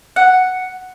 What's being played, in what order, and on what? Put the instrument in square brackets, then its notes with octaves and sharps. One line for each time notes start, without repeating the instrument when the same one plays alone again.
[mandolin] F#5